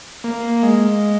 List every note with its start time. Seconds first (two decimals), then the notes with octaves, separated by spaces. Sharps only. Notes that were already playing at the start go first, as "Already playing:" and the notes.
0.24 A#3
0.63 G#3